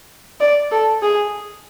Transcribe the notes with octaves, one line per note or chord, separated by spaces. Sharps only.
D5
A4
G#4